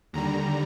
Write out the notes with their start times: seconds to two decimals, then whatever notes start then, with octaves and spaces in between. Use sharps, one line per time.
0.13 D#2 D3 G3 A#5